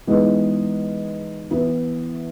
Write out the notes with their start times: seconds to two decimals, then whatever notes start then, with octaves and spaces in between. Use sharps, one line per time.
0.07 E3 G#3 B3 D#4
1.51 E3 B3 E4